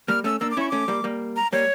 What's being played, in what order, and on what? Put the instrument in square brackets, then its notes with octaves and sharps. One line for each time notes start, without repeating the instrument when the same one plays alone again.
[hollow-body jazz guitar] G3 A#3 [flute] F6
[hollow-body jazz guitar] A3 C#4 [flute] E6
[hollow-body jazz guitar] A#3 D4 [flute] E6
[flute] D6
[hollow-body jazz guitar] C#4 E4 [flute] C#6
[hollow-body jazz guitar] A3 C#4 [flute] D6
[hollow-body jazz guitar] G3 A#3
G3 A#3
[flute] A#5
[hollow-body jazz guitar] G3 A#3 [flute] C#5